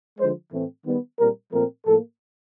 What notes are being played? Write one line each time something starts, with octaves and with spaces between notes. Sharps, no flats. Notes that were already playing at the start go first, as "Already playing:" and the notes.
D3 F3 G#3 C5
A2 E3 A3 C4
D#3 G3 B3
A#2 G3 C4 A#4
A#2 F3 A3 C4 A#4
A2 F3 A#3 A4